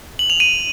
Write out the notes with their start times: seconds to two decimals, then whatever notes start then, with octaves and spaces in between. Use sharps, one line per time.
0.19 F#7
0.30 F7
0.40 D#7